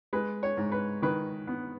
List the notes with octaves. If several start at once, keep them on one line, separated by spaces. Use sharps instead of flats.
G#3 B4
C#5
G#2
B4
D#3 B4
B3